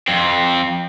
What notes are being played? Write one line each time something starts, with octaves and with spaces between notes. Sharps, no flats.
F2 C4